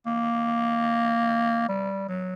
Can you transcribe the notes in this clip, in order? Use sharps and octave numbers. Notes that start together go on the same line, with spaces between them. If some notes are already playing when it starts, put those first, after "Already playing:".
A#3
G3
F#3